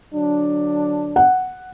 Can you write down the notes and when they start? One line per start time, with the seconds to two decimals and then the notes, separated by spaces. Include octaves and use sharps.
0.13 D3 F#3 D4
1.16 F#5